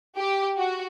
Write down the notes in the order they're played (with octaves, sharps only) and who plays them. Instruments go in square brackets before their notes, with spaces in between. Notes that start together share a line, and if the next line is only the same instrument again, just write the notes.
[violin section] G4
F#4